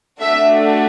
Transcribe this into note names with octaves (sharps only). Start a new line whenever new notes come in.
A3 D4 F#4 A4 E5